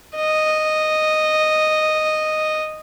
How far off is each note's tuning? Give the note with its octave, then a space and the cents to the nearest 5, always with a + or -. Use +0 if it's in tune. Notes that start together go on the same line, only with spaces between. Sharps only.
D#5 -5